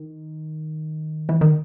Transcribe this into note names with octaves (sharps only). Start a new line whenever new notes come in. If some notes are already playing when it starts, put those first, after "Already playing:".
Already playing: D#3
E3
D#3